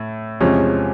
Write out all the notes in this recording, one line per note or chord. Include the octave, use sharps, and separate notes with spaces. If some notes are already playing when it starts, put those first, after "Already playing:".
Already playing: A2
E2 C3 F3 G#3 C#4